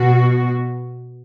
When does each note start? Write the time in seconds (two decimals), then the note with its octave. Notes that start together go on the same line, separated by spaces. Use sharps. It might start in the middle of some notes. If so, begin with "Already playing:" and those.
Already playing: B2 F#4